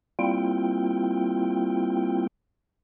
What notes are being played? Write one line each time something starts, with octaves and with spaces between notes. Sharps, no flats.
G3 A#3 C4 E4 F4 G5